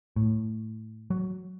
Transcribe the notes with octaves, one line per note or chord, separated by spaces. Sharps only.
A2
F#3